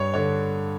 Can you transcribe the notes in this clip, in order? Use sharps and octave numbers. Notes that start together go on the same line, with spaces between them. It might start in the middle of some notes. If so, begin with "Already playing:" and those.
Already playing: G2 C#5
D3 C#5